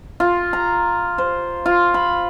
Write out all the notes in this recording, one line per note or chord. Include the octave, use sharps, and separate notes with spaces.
F4
A#5
C5
F4
B5